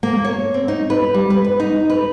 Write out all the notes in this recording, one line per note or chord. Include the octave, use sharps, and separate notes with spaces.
A#3
C#5
C4
D#4
B4
G3
B4
B4
D#4
B4